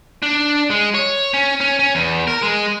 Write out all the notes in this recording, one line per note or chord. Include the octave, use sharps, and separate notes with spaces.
D4
G#3
C#5
C#4
C#4
C#4
E2
A#4
G#3